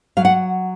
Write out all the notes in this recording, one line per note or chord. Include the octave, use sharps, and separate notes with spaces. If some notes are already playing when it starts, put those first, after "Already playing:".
F#3 F5
F#5